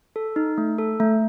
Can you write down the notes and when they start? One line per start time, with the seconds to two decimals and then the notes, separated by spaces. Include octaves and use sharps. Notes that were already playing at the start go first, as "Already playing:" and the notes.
0.16 A4
0.36 D#4
0.58 A3
0.78 A4
1.00 A3